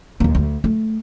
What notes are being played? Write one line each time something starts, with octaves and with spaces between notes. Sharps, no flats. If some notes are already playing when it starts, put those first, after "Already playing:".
D#2 A#3
D2
A3